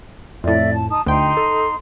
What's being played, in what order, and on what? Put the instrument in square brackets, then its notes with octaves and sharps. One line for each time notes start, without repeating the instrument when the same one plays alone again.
[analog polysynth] F2 A2 [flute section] D5 E5
[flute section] A5
D#4 A5 D#6
[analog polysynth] D2 G5 [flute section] D#4 C6
[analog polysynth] A4